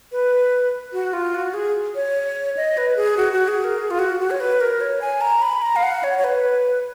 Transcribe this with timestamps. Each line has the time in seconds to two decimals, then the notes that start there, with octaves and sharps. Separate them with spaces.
0.12 B4
0.93 F#4
1.13 F4
1.34 F#4
1.54 G#4
1.95 C#5
2.57 D#5
2.77 B4
2.97 G#4
3.17 F#4
3.33 F#4
3.48 G#4
3.64 A#4
3.78 G#4
3.91 F4
3.99 F#4
4.20 F#4
4.30 C#5
4.40 B4
4.61 A#4
4.81 C#5
5.01 G#5
5.21 A#5
5.42 B5
5.62 A#5
5.76 F5
5.83 F#5
6.03 C#5
6.18 C#5
6.24 B4